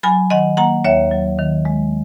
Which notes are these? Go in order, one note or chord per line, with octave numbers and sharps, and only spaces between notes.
F#3 G#5 B5
D#3 D#5 F#5
A#3 F#5 A#5
D#2 C#5 E5
F#3
D#3
G#3